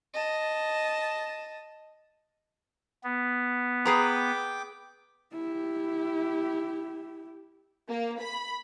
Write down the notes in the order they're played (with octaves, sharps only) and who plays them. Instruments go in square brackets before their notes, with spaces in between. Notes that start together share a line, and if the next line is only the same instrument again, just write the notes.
[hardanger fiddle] D#5 A5
[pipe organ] B3
[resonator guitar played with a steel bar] G#4 B4 A#5 [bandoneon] G5 D6
[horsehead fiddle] E4 G4
[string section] A#3
B5